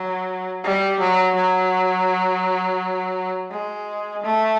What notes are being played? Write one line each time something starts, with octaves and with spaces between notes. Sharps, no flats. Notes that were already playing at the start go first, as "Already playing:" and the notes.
Already playing: F#3
G3
F#3
F#3
G#3
A3